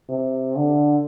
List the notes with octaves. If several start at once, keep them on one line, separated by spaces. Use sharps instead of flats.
C3
D3